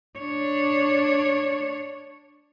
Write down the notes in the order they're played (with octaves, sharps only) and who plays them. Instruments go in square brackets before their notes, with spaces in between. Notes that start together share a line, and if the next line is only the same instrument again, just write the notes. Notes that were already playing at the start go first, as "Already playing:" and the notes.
[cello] D4 C#5